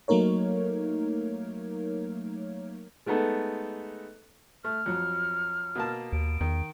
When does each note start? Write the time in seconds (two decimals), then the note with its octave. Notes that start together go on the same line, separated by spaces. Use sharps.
0.08 F#3 A3 A#3 D#4 A#4 C#5
3.06 G#3 A3 B3 D#4 A4
4.64 A3 F6
4.86 F2 F#3
5.75 B2 A#3 A5
6.13 D#2 D7
6.41 E2 D#3